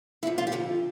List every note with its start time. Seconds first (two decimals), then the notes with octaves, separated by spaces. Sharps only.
0.23 F2 E4
0.26 D3 F3
0.38 F4
0.47 G4
0.52 F2 D3 F3 F4